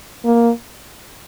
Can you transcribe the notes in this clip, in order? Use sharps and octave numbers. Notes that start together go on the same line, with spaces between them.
A#3